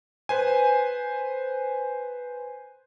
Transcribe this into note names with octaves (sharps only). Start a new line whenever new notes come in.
B4 C5 G#5